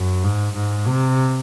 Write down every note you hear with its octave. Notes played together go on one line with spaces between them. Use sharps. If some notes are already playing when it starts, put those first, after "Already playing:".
Already playing: F#2
G#2
G#2
C3